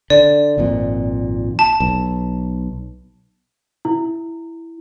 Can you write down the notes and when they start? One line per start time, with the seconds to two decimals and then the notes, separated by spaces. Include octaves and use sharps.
0.10 D3 D5
0.58 G#1 F2 A#2
1.59 A5
1.80 B1
3.85 E4